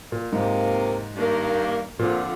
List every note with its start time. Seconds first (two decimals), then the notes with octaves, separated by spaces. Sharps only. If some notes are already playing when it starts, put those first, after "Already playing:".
0.12 A#2
0.33 G#2 C3 F3 A#3
1.16 G2 D#3 A#3
1.99 F2 A#2 D3 F3